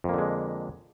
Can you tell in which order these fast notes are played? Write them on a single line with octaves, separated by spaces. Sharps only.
F2 A#3 D3 G#3